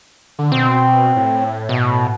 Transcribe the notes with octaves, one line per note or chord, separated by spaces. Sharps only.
D3
B2 C4
A2
B2